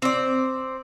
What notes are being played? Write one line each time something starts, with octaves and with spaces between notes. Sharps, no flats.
C4 D5